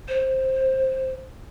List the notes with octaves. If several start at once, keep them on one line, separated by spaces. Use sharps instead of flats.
C5